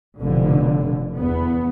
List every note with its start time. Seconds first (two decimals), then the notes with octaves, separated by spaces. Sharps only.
0.19 F1 F2 B2 D3
1.17 E2 B3